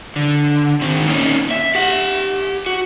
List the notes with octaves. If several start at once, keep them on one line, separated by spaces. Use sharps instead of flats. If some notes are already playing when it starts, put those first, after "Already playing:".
D3
D#3 C4
A#3 C#4 D#4
E5
G4 F#5
F#4